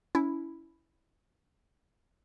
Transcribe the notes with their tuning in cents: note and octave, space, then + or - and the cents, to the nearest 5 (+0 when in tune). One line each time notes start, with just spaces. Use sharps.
C#4 +30 E4 +0